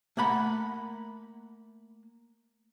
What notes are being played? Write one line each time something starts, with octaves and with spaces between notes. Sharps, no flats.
A3 A#3 F#5 B5